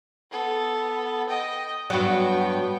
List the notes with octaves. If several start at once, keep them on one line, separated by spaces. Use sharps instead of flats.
B3 A4
D#5 G5
G2 F#3 B3 G5